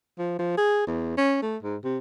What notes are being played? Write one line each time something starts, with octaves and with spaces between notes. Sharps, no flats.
F3
F3
G#4
E2
C#4
A3
G#2
C3